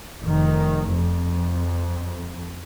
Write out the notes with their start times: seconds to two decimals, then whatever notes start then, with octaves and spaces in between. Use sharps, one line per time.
0.22 F1 D#3
0.92 F2